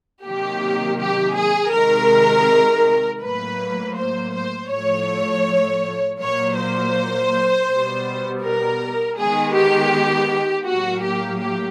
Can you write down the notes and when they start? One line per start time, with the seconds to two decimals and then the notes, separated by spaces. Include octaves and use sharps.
0.24 C3 D#3 F#3 A#3 G4
0.99 G4
1.36 G#4
1.73 C3 D#3 G#3 A#4
3.21 A2 F#3 A#3 B4
3.97 C5
4.34 C5
4.71 A2 F3 A3 C#5
6.19 A#2 F#3 A#3 C#5
6.57 C5
7.68 B2 G3 B3
8.43 A#4
9.17 D#3 G#3 B3 G#4
9.54 G4
10.66 A2 F#3 A#3 F#4
11.03 G4
11.40 G4